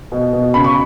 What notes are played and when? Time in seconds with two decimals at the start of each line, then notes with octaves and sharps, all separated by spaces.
0.12 B2
0.33 B2
0.54 C#3 B5
0.64 C#6